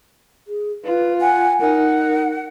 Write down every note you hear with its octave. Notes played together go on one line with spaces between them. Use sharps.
G#4
F4 B4
F#5 G#5
D#4 A#4 F#5